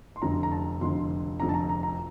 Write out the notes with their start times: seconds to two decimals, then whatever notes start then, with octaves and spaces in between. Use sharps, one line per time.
0.16 C6
0.22 F1 F2 D3 A#5
0.43 A#5
0.52 A5
0.81 F1 F2 D3 C6
1.40 F1 F2 D3 A#5
1.49 A5
1.54 A#5
1.69 A#5
1.83 A#5